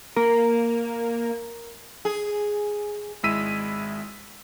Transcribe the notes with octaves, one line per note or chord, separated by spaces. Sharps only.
A#3 A#4
G#4
G#1 G#3 E4 E6 B6 D#7